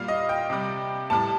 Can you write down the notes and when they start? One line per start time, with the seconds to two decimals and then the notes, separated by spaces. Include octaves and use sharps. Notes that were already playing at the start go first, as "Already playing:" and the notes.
Already playing: A#2 G3 F5
0.08 D#5
0.29 G5
0.50 C3 G3
1.10 A2 G3 A5